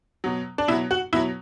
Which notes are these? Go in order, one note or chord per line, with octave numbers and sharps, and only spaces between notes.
B2 F#3
D4
B2 F#3 E4
F#4
B2 F#3 E4